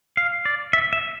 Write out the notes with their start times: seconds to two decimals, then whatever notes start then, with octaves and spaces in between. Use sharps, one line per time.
0.17 F5
0.45 D5
0.73 E5
0.93 E5